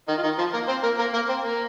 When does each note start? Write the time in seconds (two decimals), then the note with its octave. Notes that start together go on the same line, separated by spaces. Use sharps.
0.08 D#3 D#4
0.18 F4
0.23 D#3 D#4
0.38 F3 F4
0.53 A#3 A#4
0.68 C4 C5
0.83 A#3 A#4
0.99 A#3 A#4
1.14 A#3 A#4
1.29 C4 C5
1.44 A#3 A#4